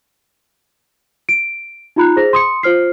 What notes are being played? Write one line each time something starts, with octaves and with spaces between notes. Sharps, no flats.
D7
D#4 F4 A#5 B5 F#6
G#4 C5 A#6
C6 D#6 C#7
F4 C5 F6 C7